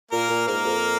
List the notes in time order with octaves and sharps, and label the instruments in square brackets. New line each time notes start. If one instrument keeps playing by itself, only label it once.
[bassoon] A#2 [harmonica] A#3 A#4
[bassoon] A#2
[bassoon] G#2 [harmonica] A#3 A#4
[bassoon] F2